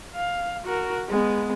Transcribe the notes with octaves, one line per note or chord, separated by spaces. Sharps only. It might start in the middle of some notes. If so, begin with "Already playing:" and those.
F5
F#4 A#4
G#3 B3